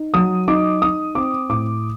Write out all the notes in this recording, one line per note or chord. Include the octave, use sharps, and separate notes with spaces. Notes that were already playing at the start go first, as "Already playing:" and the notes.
Already playing: D#4
F#3 D#6
D#4 D6
D#4 D#6
C4 D6
A2 D6